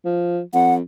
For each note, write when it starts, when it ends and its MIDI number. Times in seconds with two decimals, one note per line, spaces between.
0.05 0.40 53
0.54 0.81 41
0.54 0.74 78